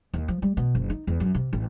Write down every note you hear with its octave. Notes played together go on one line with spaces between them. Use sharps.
D#2
F3
G3
B2
F#1
D#4
E2
F#2
C3
A1